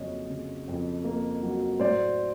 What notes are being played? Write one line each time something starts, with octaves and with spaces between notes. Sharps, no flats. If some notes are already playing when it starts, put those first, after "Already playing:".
Already playing: F2 C#3 F#3 A#3 C#5 D#5
C#3
F2
A#3
F#3
A2 C5 D5